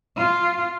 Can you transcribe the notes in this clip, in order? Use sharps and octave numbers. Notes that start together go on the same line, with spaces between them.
F4